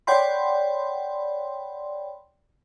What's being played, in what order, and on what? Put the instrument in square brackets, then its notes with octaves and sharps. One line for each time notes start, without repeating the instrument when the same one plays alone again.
[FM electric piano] C#5 D5 F#5 G5 B5 C6